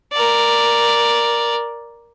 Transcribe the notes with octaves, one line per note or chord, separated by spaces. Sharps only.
A#4 D5